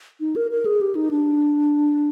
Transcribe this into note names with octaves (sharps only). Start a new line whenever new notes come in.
D#4
A#4
A#4
G#4
G4
D#4
D4